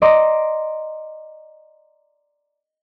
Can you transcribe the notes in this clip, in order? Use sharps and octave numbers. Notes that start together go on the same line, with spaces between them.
D5 D#5 A#5 C6 D6